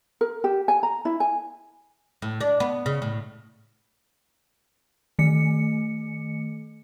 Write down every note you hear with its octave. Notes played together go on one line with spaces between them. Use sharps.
A#4
G4
G#5
A#5
E4
G#5
A2
D4
B3
C#3
A2
D#3 A3 C#7